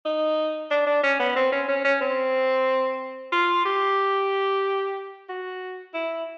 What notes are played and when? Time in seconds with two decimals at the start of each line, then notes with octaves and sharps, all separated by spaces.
0.05 D#4
0.71 D4
0.87 D4
1.03 C#4
1.20 B3
1.36 C4
1.52 C#4
1.68 C#4
1.84 C#4
2.01 C4
3.32 F4
3.65 G4
5.29 F#4
5.94 E4